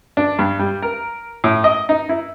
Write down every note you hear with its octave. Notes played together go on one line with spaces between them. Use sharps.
D4
G2
G3
A#4
A2
D#5
D#4
E4